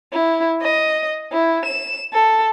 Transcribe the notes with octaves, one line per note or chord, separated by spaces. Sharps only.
E4
D#5
E4
E7
A4